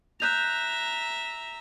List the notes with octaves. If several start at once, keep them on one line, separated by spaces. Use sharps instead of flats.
E5 A#5 F#6 G6 F7